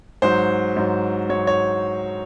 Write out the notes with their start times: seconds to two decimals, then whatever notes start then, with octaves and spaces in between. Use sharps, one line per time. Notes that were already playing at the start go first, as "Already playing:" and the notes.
0.22 G#2 F#3 C5
0.76 G#2 F#3
1.29 G#2 F#3 C#5
1.47 C#5